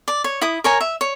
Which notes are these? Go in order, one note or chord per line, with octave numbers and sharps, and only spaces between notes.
D5
C#5
E4 D#6
A#4 C#5 G#5 A#5
E5
C#5